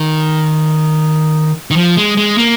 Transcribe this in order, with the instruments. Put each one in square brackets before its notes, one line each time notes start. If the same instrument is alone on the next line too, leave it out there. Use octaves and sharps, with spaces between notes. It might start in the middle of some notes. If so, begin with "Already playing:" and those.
Already playing: [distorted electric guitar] D#3
D#3
F3
G#3
G#3
A#3